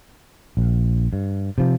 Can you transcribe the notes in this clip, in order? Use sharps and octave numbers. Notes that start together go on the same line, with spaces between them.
A#1
G2
C3 F3